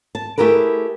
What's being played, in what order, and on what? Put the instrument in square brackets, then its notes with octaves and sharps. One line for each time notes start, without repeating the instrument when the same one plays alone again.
[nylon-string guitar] A5
A3 E4 G4 G#4 A#4 B4